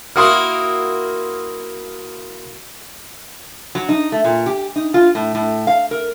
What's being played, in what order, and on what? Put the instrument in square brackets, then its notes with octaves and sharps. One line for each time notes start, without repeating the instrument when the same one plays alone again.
[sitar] A#3 E4 F#4 [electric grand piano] C6 D#6 F6
[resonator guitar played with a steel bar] F#3
D#4
A3
A#2
G4
D#4
F4
A2
A2
F5
A#4